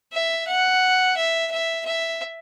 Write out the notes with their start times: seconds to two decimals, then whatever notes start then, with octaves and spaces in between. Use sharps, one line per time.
0.13 E5
0.47 F#5
1.17 E5
1.51 E5
1.85 E5